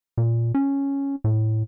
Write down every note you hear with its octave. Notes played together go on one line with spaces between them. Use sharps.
A#2
C#4
A2